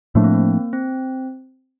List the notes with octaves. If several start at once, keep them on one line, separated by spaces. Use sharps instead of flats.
A2 F3 A3 A#3 D4
C4
A#3
C4